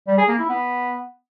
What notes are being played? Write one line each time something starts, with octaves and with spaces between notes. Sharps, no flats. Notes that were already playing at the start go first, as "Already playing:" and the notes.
G3
G#4
A#3
E4
B3